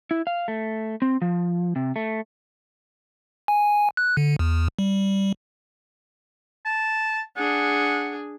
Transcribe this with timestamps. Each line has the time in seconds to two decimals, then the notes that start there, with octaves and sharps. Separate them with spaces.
0.11 E4
0.27 F5
0.48 A3
1.02 C4
1.22 F3
1.76 C3
1.96 A3
3.48 G#5
3.97 F#6
4.17 D3
4.39 E2
4.79 G3
6.65 A5
7.37 D4 G#4 F#5